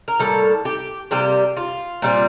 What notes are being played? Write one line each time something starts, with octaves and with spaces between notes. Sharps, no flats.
A#4
A2 G3 A#3 A4
G4
C3 G3 A#3 G4
F4
A#2 G3 C4